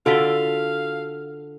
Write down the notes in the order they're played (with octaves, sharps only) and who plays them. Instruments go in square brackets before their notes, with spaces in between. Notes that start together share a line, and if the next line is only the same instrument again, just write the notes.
[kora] D3 D4 F4 [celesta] F#4 B6 G7 [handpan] A4 [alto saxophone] F5